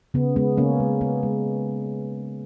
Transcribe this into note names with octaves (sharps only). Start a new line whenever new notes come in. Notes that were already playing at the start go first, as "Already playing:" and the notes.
C#3 B3
G#3 B3
C#3 A#3 C#4
G#3
C#3 B3
G#3